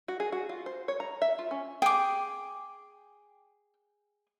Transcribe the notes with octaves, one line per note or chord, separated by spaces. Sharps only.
F#4
G#4
F#4
F4
C5
C#5
A#5
E5
F4
C#4
G#4 G5 D6